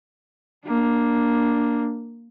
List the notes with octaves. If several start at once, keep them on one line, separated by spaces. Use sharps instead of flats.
A#3 D4